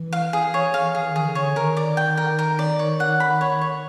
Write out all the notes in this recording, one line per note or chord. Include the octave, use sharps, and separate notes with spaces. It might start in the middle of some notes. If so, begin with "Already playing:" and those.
Already playing: E3
F5
G#4
C#5
F5
E3 G#4
D#3
G#4
D3
C#5
D3
D#3 A#4
D5
G5
A#4
A#4
D5
C#5
F#5
B5
C#5
C#5